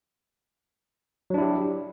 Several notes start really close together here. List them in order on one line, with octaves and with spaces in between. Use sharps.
F#3 D4 E4 G4